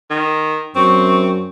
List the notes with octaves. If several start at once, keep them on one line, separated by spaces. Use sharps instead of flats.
D#3
F#2 C4 C#6